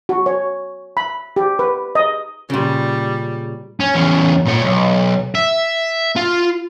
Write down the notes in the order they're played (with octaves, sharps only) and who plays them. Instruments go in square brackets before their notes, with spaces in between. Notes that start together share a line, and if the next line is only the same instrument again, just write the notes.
[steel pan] F#4
C#5
B5
G4
B4
D#5
[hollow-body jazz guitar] A#2 C#3 [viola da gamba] G3
[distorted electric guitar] C#4
E2 C#4
A#2 C#5
B1
E5
F4